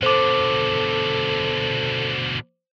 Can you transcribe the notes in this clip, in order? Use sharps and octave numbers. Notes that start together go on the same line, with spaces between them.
B2 D3 A4 C5 D6